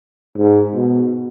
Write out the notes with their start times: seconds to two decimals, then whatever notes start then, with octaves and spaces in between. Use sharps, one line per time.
0.37 G#2
0.75 B2